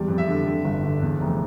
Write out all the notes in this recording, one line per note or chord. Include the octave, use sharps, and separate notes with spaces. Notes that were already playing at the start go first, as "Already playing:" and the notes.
Already playing: E2 G3
F2
E5
D3
D3
G1
D3
E2
F1